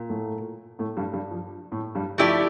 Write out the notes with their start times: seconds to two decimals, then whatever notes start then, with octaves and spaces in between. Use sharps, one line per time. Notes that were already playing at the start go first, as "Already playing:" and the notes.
Already playing: A#2
0.09 A2 A3
0.79 A2 A3
0.97 G2 G3
1.13 G2 G3
1.31 F3
1.72 A2 A3
1.95 G2 G3
2.18 F3 A3 E4 G4 D5